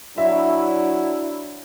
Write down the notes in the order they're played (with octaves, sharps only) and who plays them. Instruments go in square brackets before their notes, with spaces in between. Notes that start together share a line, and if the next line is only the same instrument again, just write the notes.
[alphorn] F#3 [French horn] D4 [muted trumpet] E4 [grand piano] E5